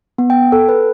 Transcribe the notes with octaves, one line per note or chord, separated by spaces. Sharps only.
B3
G5
A4
B4